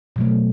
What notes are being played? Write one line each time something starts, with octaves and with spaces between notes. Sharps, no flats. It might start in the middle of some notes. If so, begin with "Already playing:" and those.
B2 F#3 A3